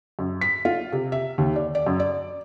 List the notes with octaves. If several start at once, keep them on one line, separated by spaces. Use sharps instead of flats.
F#2
B6
F4
C3
E5
D#2
D5
D5
F#2
D5